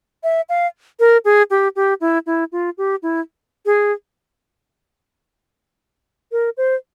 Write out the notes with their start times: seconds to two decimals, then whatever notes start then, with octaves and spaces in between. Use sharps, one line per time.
0.23 E5
0.49 F5
1.00 A#4
1.25 G#4
1.50 G4
1.76 G4
2.01 E4
2.26 E4
2.52 F4
2.78 G4
3.03 E4
3.66 G#4
6.32 A#4
6.57 C5